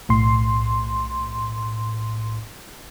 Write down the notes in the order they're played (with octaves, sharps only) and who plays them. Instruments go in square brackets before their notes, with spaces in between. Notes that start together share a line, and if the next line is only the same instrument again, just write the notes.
[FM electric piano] B1 A2 C6